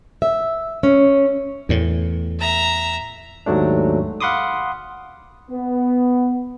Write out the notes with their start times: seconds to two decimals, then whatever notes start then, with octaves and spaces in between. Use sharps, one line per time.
0.22 E5
0.83 C#4
1.69 E2 A2
2.40 E5 A#5
3.46 D#2 G#2 F#3 A3 D4
4.21 F5 F#5 B5 C6 D6 D#6
5.51 B3